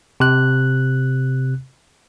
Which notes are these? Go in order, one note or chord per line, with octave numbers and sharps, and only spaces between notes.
C3 F#6